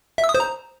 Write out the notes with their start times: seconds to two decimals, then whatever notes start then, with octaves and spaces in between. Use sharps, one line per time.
0.18 E5
0.24 E6
0.29 D#6
0.35 C5
0.40 A#5